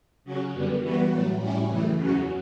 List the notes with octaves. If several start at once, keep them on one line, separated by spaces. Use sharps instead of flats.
C#3 F#3 C#4 F#4
F#2 D3 G3 B3
E3 G3 B3 F#4
A2 F#3 A3
A2 G3 C#4 E4
F#2 C#3 E3 A3
E2 C#3 F#3 C#4 F#4